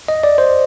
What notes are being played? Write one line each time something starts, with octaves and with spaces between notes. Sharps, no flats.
D#5
D5
C5